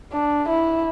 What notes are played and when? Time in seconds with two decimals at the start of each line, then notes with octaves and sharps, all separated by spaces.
0.13 D4
0.49 E4